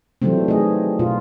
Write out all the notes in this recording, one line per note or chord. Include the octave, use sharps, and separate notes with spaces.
D#3 E3 F#3 G3 A3 C4
G#4 D#5
B2 F4